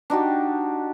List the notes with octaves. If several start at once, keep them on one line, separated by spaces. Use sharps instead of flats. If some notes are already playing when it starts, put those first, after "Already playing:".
D4 D#4 F#4 G4